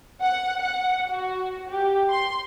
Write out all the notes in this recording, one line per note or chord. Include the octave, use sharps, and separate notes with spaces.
F#5
F#5
F#4
G4
C6